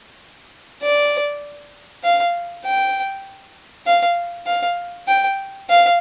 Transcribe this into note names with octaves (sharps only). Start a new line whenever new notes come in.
D5
F5
G5
F5
F5
G5
F5